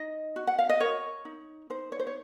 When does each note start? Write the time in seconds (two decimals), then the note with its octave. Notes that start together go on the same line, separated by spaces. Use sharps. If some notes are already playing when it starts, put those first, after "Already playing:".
Already playing: D#4 D#5
0.36 F#4
0.47 F#5
0.59 F5
0.69 D#5
0.80 A#4 C#5
1.25 D#4
1.70 D#4 C5
1.92 C#5
1.99 C5
2.07 C#5